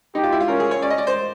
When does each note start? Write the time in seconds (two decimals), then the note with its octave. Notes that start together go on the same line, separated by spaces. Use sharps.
0.15 D#4 G4
0.24 F4
0.32 E4
0.40 F4
0.48 C#4 A#4
0.60 G#4
0.71 C#5
0.82 C#4 D5
0.90 D#5
0.98 D5
1.07 C5